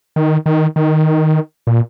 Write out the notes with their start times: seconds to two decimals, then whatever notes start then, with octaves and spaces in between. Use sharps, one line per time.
0.16 D#3
0.46 D#3
0.76 D#3
1.67 A#2